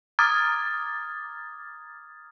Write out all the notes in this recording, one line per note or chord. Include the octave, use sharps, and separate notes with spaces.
A#5 D6 D#6 F6 G#6 A6